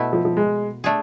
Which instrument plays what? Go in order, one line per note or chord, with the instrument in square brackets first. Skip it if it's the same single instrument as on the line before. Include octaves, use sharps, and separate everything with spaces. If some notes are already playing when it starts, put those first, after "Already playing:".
Already playing: [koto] B2 A3 E4
[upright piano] F3
F3
G#3
[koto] A3 D4 G#4